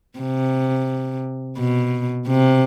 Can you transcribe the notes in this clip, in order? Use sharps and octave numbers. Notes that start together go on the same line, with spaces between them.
C3
B2
C3